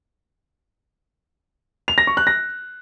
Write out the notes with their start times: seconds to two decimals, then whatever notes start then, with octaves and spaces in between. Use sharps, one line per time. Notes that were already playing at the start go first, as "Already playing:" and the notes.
1.88 F7
1.98 A#6
2.07 C#6
2.17 F#6
2.27 A#6